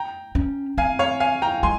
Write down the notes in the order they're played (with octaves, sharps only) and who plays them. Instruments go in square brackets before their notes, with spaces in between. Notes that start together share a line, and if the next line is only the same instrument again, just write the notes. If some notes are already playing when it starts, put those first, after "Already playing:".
Already playing: [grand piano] G5 A#5
[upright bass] C#4
[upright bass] C4 [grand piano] F5 G#5
[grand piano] C#5 F5
F5 G#5
G5 A#5
[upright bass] G#3 [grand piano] G#5 C6